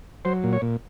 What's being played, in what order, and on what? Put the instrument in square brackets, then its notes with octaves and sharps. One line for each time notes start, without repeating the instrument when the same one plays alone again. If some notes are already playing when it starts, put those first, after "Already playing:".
[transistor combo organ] F#3 C5
A#2
C#5
A#2